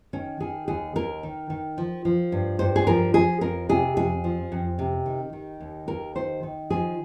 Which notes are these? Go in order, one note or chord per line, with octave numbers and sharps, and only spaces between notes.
D#3 C#4
D#3 G#4
D#2 G#4
D#2 A#4
D#3
D#3
F3
F3
G2
G2 C5
G#4
F3 A#4
F3 G#4
F2 A#4
C3 G#4
F2 G#4
F3
F2
C3
D#3
D#3
D#2
D#2 A#4
D#3 C5
D#3
F3 G#4